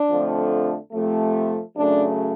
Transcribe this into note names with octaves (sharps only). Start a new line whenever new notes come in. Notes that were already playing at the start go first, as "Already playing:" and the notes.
Already playing: D4
F2 D3 F3 A3
C3 F3 A3
F#2 C#3 F#3 A3 D4